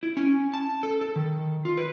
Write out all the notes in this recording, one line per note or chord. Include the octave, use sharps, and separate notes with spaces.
E4
C#4
A5
A4
A4
D#3
F4
B4